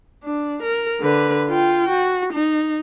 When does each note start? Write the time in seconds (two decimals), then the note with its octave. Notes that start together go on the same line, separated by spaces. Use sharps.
0.24 D4
0.63 A#4
1.01 D3 B4
1.48 F4 G5
1.89 F#4
2.33 D#4